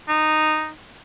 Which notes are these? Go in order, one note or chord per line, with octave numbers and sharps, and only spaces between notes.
D#4